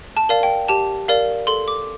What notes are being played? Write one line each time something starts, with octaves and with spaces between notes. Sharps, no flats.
A5
A#4 D5 F5
G5
G4 A5
A#4 D5 F5
A4 C6
D6